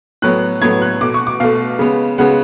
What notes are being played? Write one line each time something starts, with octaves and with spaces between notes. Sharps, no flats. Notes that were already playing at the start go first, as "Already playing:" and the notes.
A2 F#3 B3 F#6
A2 F#3 B3 G#6
F#6
B2 A3 D6
C#6
D6
B2 A3 F5
C#3 G#3 B3
C#3 G#3 B3 F#5